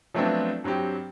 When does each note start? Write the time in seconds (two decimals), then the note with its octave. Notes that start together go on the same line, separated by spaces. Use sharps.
0.14 F3 F#3 A3 B3 C4 D4
0.64 G2 F#3 C4 G4